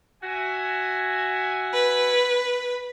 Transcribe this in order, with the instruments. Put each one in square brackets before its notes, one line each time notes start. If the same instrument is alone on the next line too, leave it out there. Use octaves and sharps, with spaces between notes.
[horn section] F#4 E5 G#5
[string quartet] B4